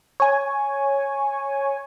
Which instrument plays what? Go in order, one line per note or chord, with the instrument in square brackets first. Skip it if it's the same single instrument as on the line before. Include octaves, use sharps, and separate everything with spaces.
[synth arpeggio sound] C#5 G#5